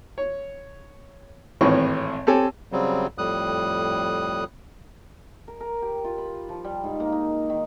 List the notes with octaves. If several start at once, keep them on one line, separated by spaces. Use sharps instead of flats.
C#5
G#1 A2 E3 C4 C#5 C#6
C4 G4 A4 C#5 G#5
C#3 F#3 G3 C4
F2 A2 G3 D#6 F#6
A#4
A#4
G4
F4
B5
F3
G3
G#2
A#3
D#4
D#3